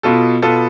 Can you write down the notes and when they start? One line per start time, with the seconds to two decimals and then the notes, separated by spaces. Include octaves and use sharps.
0.03 B2 B3 F4 A4
0.42 B2 B3 F4 A4